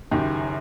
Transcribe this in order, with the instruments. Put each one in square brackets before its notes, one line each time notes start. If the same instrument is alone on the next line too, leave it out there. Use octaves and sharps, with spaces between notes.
[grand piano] F#1 F#2 D#3 G4